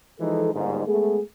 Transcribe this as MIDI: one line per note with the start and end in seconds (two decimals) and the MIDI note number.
0.20 0.51 52
0.20 0.51 53
0.20 0.51 56
0.20 0.51 63
0.20 0.51 69
0.54 0.85 31
0.54 0.85 39
0.54 0.85 44
0.87 1.20 56
0.87 1.20 57
0.87 1.20 59
0.87 1.20 68